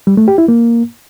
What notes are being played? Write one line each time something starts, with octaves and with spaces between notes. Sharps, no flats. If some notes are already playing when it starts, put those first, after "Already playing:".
G3
A3
G4
E4
A#3